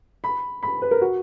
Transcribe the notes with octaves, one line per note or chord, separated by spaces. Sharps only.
B5
B5
B4
A#4
F#4